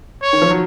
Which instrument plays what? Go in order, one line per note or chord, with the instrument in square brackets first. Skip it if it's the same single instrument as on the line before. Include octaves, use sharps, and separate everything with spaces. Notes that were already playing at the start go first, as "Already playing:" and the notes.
[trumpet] C#5
[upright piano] D#3
F3
F#3